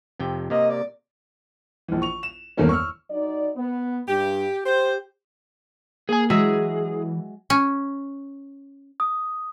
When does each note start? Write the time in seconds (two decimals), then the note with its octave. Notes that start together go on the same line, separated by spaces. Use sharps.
0.20 F2 C3 G5
0.50 C3 A#3 D#5
0.70 D5
1.88 A#1 E3
2.02 C#6 F7
2.23 E7
2.57 G1 E2 D#3 A3 A#3 C#4
2.69 C#6 E6 F6
3.09 F#3 D#4 D5
3.56 B3
4.08 G2 G4
4.65 G4 C5
6.09 A#3 G#4 G#5
6.30 E3 F#3 G#3 G#4 E5
7.50 C#4
9.00 D#6